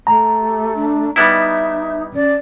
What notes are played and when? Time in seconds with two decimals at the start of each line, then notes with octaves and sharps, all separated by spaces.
0.07 A3 A#5
0.40 G4
0.74 D4
1.16 G3 B3 D#4 E4 E5
2.14 C#4 D5